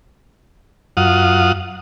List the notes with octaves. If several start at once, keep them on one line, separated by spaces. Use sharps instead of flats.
F#2 F4 F#5 D#6